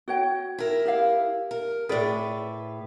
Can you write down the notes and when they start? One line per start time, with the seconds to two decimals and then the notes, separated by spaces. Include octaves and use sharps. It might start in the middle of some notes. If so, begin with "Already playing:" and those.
0.08 F#4 C#5 G5
0.58 E4 A#4
0.85 G4 E5 F5
1.51 A#4
1.89 A2 G#4 B4 D5